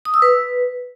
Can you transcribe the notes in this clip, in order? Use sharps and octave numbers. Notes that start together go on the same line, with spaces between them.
D#6
E6
B4